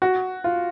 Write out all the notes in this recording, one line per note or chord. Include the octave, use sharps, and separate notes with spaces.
F#4
F4